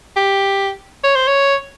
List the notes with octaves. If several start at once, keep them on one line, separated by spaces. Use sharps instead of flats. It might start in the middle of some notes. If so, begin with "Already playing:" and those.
G4
C#5
C5
C#5